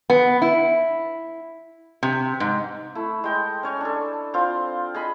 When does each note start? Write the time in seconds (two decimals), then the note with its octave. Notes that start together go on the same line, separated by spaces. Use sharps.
0.10 B3
0.42 E4
2.03 C3
2.40 G#2
2.95 A3 E4
3.24 G#3 G5 C6
3.63 C#4 C#5 G#5
3.81 D4 A4
4.34 C4 F4
4.94 G#4 D#5 B5